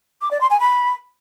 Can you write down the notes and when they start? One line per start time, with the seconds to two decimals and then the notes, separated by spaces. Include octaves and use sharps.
0.21 D6
0.31 D5
0.41 C6
0.50 G#5
0.60 B5